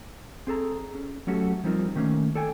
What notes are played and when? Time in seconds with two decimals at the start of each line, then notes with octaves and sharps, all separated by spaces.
0.47 C4 G#4 A4 A#5
0.95 C#4
1.27 F#3 A3 C#4 F#4 G4 A4
1.64 F3 G3 C4 D#4 F4 A#4
1.96 D#3 A3 A#3 C#4
2.35 A4 D5 G5 G#5